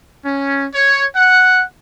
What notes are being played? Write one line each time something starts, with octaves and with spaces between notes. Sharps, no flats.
C#4
C#5
F#5